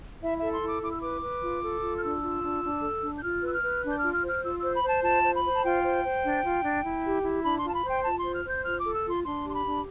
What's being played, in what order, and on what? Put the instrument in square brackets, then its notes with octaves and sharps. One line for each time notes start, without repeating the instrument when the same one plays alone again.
[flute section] E4 E5
A4 E5
C6
E4
D6
E4 D6
E6
B4 D6
B4
F4
A4
F4
F6
D4 E6
F4
D4
D4
A4
D4
G6
F4 F6
B4 E6
F6
B4
D4
G6
F4 F6
F6
C5
F6
F4 E6
C5 E6
B5
C5 A5
F4 A5
C5
B5
C5
A5
F4 G5
C5
C5
D4
F4
D4
E4
G4
E4
D4 B5
C6
F4 A5
B5
C5 G5
F4 A5
C6
C5
F6
C5
G6
F4 F6
A4 D6
E6
F4 C6
D4 C6
G4
C6
B5
D4